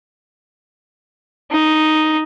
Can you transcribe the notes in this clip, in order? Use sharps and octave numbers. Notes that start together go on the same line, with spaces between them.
D#4